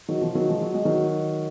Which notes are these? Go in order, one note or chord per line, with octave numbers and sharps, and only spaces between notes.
D#3 F#3
F3
D#3 F#3
F3 G#3
F#3
G#3
D#3 F#3